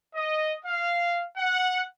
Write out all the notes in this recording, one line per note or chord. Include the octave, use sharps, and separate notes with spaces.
D#5
F5
F#5